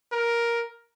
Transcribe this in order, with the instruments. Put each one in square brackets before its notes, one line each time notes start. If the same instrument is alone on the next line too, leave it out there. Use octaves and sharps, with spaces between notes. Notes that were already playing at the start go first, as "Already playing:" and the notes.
[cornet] A#4